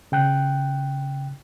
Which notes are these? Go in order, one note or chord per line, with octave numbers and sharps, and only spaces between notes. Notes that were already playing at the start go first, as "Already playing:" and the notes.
C#3 G5 F#6